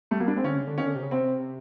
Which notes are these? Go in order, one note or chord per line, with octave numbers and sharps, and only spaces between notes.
G3 A3
F#3 A#3
G3 D4
G#3 C4
D3 C#4
C#3
D3
D#3 C#4
D3
C3
C#3
C3 C4